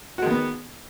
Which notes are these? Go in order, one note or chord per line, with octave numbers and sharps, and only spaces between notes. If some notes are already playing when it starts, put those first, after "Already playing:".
D#3 G#3 B3 F#4